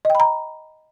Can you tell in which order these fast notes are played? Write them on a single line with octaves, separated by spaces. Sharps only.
D#5 G5 B5 A#5